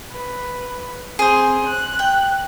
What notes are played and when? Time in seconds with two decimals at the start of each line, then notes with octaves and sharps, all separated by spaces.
0.11 B4
1.19 C4 G#4 C5
1.65 F#6
1.99 G5